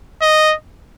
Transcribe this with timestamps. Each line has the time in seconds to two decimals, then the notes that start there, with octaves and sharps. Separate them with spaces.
0.22 D#5